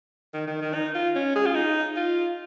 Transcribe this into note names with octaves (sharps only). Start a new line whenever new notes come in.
D#3
D#3
D#3
D#4
F4
C#4
G#4
F4
D#4
F4